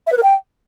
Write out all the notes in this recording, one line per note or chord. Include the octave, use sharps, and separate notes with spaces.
E5
B4
A#4
G5